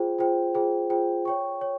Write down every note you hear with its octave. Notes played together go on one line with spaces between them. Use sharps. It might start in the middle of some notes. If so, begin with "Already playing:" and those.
Already playing: F4 G#4 C5 G5
F4 G#4 C5 G5
F4 G#4 C5 G5
F4 G#4 C5 G5
C#5 G5 C#6
C#5